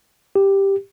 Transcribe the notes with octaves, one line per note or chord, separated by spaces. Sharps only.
G4